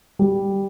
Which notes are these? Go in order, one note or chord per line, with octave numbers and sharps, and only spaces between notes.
G3